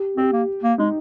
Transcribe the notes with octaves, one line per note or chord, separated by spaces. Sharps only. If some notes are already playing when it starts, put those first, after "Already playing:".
Already playing: G4
C4 G4
A#3
A#3
G#3 D#4